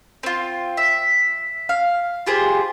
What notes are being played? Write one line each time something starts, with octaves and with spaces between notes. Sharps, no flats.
C4 F4
E5
F5
F4 G4 G#4 C5